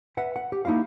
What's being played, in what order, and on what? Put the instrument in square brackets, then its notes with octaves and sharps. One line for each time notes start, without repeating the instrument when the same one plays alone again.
[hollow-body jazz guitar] B4 E5 F#5
F#5
G4
A#3 D#4 E4 F#4 F5